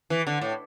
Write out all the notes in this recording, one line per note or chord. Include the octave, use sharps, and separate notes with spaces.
E3
D3
A2